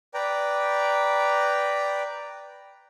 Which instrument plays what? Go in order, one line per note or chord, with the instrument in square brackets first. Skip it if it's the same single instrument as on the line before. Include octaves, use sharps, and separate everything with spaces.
[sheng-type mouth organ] B4 D5 G5 A#5